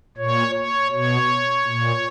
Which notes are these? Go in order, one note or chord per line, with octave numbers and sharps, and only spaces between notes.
A#2 C#5
C#5
B2 C#5
A#2